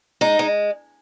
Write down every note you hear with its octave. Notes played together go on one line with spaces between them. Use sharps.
G#3 D#4
G#3